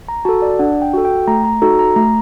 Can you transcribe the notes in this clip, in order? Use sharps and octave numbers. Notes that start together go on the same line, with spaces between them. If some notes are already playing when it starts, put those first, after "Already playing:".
A#5
F#4 A4 A5
D5
D4 F#5
G5
F#4 A4
G5
A3 A#5
A#5
D#4 F#4 A4 A#5
A#5
A3 A#5